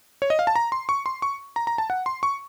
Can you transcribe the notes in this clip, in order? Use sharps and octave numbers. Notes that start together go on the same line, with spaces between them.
C#5
D#5
F5
A5
A#5
C6
C#6
C6
C#6
A#5
A#5
A5
F#5
C6
C#6